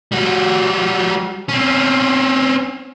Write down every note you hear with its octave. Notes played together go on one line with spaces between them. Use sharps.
G3 F#4
C4 C#4